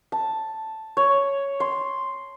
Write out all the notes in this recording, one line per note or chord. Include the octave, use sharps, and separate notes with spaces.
A5
C#5
C6